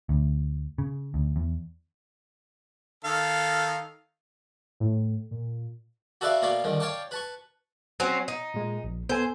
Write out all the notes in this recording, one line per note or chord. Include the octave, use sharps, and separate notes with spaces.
D2
C#3
D2
E2
D#3 A4 F5
A2
A#2
F#4 A4 B4 D5 E5 F5
B2 A#3 D5 F5 B5 C#6
C2 D3 D#3
C#5 D5 F5 G5 A5 D6
B4 A5 C#6
F#3 C4 C#4
D#4
A#2 G#3
A#1
B3 A4 C5 G#5